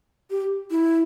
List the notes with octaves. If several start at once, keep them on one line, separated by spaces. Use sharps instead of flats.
G4
E4